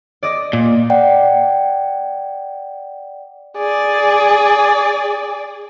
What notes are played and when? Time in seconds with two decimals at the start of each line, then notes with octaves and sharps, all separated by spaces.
0.23 D5 D#5
0.53 A#2
0.90 D5 F#5 G5
3.57 G#4 D5